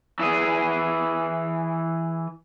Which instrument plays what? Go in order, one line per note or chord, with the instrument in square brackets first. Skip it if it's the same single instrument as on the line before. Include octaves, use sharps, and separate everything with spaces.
[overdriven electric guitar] E3 G#4